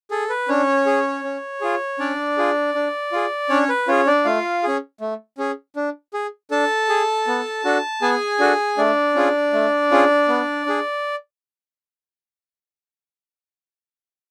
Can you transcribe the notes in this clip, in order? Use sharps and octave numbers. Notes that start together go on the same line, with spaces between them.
G#4 A4
B4
C#4 D4 C#5
G#4
C#4
F4 G#4
C#4 D4 D5
F4 G#4
D4
F4 G#4
C#4 D4 C#5
B4
C#4 F4 G#4 C#5
D4 D5
A3 F4 F5
C#4 G#4
A3
C#4 G#4
D4
G#4
D4 A4 A5
G#4
B3
D4 F#4 A4
B3 G#4 G#5
D4 F#4 A4
A3 D4 D5
C#4 F4 G#4
A3
C#4 F4 G#4
B3
D4 G#4